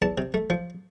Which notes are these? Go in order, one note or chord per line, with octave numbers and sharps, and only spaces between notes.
E2 A5
C3
A3
F3